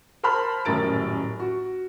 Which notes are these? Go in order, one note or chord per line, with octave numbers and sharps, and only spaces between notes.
A#4 C5 A5 B5 C6 F6
D#1 F#2 A2 A#4 A6 D7
F#4